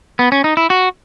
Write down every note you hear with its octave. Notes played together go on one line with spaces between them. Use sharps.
B3
C#4
D#4
E4
F#4